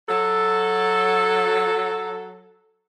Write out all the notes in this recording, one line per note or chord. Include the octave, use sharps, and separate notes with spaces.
F#3 A4